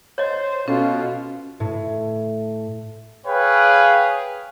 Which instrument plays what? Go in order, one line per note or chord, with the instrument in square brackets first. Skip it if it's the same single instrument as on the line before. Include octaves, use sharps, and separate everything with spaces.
[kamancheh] C5 [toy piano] C#5 D#5
[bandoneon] B2 [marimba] C#4 A4 [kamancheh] F4
[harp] A2
[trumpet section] G#4 B4 C#5 F5 G5